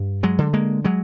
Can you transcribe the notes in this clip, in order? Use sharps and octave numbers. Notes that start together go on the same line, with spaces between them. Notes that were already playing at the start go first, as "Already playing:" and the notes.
Already playing: G2
F#3 G#3
D3
G#3 A#3
F#3 G#3